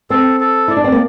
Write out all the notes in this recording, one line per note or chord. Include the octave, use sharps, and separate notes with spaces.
C4 A4
A4
E4 D5
D4
C4
A#3